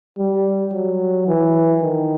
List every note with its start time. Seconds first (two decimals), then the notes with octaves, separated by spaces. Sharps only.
0.18 G3
0.73 F#3
1.28 E3
1.82 D#3